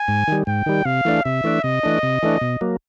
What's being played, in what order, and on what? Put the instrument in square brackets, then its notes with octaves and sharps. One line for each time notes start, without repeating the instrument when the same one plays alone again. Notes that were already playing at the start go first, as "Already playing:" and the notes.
Already playing: [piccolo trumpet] G#5
[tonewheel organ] G#2
D#3 G3
[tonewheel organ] G#2 [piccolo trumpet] G5
[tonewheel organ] D#3 G3
[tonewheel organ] C3 [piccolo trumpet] F5
[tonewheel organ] E3 A3 D4
[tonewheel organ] C3 [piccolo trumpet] E5
[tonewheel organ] E3 A3 D4
[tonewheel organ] C3 [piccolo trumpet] D#5
[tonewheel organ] E3 A3 D4
C3
E3 A3 D4
B2
F#3 A#3